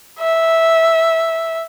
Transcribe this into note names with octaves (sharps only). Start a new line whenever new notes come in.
E5